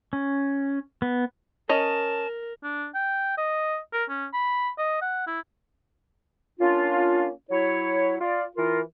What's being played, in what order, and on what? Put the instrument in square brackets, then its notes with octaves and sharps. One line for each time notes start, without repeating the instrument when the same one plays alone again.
[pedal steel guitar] C#4
B3
[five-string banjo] C#4 D#5 [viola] A#4 [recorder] A5
[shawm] D4
G5
D#5
A#4
C#4
B5
D#5
F#5
E4
[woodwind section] A#3 C#4 D4 F4
F#3 E4 C#5
F4 D5
E3 F4 A#4